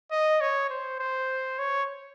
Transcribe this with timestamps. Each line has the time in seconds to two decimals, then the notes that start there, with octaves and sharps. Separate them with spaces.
0.12 D#5
0.41 C#5
0.70 C5
1.00 C5
1.59 C#5